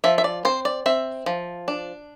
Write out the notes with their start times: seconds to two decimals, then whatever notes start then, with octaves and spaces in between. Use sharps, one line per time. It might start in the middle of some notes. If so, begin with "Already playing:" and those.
0.04 F3 E5
0.18 E5
0.24 D5
0.45 C4 C5
0.65 D5
0.86 C4 E5
1.26 F3
1.68 D4